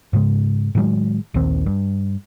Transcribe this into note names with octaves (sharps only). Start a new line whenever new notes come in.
G#2 C#3 G#3
A2 D#3 F#3 G#3
A#1 D#2 D#3 C4
G2